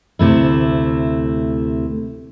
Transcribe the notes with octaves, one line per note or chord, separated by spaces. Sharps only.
D2 C3 A3 E4